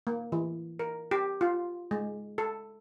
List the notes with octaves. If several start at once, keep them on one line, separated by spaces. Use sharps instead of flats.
A#3
E3
A#4
G4
F4
G#3
A4